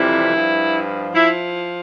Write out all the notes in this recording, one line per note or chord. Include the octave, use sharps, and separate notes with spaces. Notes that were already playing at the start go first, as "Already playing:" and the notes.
Already playing: F2 C3 E3 G3 E4
G2 F3
F3 E4